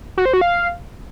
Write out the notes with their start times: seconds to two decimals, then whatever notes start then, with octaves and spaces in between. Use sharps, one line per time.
0.18 F#4
0.26 C5
0.33 F#4
0.41 F5